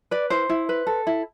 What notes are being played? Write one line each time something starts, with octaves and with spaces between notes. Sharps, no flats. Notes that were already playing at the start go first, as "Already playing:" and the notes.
B4 D5
E4 C5
E4
B4
A4
E4